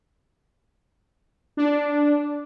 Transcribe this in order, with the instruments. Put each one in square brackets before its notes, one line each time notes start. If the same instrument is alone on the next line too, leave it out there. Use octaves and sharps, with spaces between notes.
[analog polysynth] D4